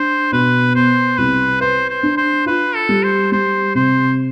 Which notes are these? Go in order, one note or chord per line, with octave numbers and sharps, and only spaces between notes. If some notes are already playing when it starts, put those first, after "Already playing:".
Already playing: D4 C5
B2 B4
B3 C5
C2 B4
B4 C5
C5
D4
C5
F4 B4
A4
G3
C5
G3 C5
C3 C5